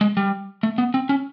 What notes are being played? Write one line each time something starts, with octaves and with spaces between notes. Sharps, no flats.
G#3
G3
A3
B3
C4
C#4